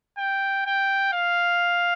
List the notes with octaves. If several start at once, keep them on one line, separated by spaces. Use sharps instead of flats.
G5
G5
F5